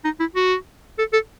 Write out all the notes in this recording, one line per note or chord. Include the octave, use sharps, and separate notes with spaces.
D#4
E4
F#4
A4
A4